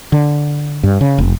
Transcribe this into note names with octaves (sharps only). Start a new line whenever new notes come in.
D3
G2
C#3
F1